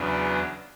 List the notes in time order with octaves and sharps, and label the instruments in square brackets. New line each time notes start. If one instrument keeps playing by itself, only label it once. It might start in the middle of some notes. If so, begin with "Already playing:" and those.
Already playing: [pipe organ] E2 C#3 F#3 B3 D4